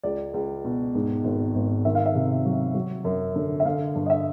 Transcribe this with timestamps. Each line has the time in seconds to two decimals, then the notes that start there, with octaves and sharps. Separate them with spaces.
0.03 C#2 D5
0.34 C#2
0.65 B2
0.95 G#2
1.24 G#1
1.55 G#1
1.85 D#3 E5
1.95 F5
2.06 E5
2.15 C3
2.45 F#3
2.74 F#3
3.04 F#2
3.35 D3
3.60 E5
3.65 D3 F5
3.95 G2
4.06 D#5
4.10 E5